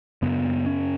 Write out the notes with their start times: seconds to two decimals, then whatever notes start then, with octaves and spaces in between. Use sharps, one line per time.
0.22 F#2 C#3 B3
0.66 C#4